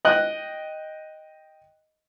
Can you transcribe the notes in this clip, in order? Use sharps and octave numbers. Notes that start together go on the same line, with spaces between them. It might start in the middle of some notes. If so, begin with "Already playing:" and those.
D#5 G5 F#6